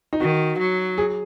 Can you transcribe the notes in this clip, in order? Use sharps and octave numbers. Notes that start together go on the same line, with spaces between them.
D#4
D#3 F#4
F#3
G#4